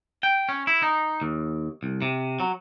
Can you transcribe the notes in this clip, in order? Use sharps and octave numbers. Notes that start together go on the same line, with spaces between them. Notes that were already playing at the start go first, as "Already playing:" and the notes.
G5
C#4
E4
D#4
D#2
C2
C3
F#3